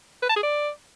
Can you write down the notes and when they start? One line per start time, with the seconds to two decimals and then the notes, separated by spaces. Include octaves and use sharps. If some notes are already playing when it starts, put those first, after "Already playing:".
0.22 B4
0.29 A5
0.36 G#4
0.43 D5